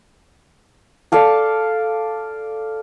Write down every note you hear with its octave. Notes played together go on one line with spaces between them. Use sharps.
A4 D5 F5 A5